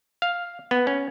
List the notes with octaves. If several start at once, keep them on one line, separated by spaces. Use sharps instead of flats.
F5
B3
C#4